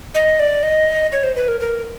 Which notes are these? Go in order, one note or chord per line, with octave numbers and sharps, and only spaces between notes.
D#5
D5
D#5
C#5
C5
B4
A#4
A#4